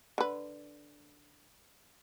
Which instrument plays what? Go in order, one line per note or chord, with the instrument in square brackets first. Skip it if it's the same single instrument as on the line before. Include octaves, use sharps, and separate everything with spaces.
[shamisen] D3 B4